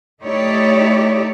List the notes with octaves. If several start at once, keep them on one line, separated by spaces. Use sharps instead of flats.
A3 D#4 E4 G4 C#5 D5